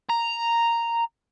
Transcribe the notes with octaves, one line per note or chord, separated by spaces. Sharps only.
A#5